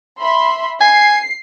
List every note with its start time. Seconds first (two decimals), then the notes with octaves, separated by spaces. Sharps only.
0.20 E5 B5 C6
0.81 G#5 C7